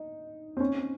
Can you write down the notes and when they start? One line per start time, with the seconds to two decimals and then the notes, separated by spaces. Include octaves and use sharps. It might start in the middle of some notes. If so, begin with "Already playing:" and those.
Already playing: D#4
0.57 C4
0.60 C#4